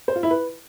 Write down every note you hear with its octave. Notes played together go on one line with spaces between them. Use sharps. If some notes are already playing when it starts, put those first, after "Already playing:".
C5
F4
E4
B4